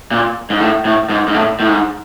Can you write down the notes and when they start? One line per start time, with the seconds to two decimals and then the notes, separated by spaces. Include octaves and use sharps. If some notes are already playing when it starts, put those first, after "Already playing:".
0.11 A#2
0.50 G#2
0.60 A2
0.85 A2
1.10 G#2
1.28 G#2
1.34 A2
1.60 A2
1.68 G#2